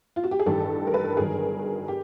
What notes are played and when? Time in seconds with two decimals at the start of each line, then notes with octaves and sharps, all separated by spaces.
0.16 F4
0.24 F#4
0.31 G4
0.39 G#4
0.46 A1 G2 D#3 G4 A4
0.87 A#4
0.94 A4 B4
1.17 G1 G2 D#3 F#3 G#4 A#4
1.88 G4